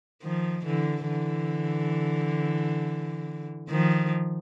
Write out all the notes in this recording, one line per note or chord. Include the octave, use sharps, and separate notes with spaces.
D#3 F3
D3 E3
D3 E3
D#3 F3